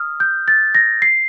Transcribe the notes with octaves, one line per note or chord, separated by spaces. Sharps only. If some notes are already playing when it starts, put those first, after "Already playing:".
Already playing: D#6 F6
G6
A6
A#6
C7